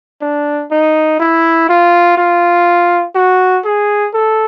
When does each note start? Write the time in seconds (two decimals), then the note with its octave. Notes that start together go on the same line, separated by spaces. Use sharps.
0.21 D4
0.71 D#4
1.19 E4
1.69 F4
2.17 F4
3.15 F#4
3.65 G#4
4.14 A4